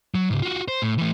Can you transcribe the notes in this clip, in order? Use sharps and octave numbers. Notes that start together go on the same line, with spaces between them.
F#3
C#2 G#2
F4 F#4
C5
A2
E3 A3